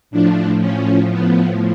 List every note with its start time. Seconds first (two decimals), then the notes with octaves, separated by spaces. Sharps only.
0.11 A2 F3 D4
0.60 C#4
1.10 B3